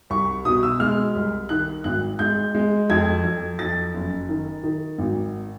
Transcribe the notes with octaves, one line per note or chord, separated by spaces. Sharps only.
C2 C#6
B2 D#6
E6
G#3 F6
C2
D#3 F#6
G#1 F#6
G#3 G6
G#3
F2 G#6
F2
F2 A6
F#1
D#3
D#3
G#1